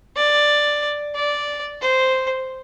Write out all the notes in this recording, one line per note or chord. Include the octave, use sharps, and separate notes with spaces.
D5
D5
C5